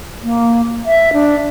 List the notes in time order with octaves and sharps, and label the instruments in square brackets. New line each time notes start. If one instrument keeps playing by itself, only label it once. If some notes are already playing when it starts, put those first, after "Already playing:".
[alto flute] A#3
E5
D4